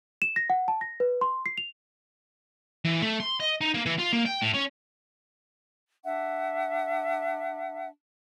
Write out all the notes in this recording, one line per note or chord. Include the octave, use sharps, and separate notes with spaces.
E7
A#6
F#5
A5
A#6
B4
C6
C7
F7
E3
A3
C6
D#5
D#4
A#3
E3
F4
A#3
G5
A2
C#4
D4 E5 F#5